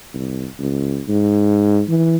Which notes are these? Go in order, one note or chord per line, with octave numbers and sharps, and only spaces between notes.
C2
C#2
G#2
E3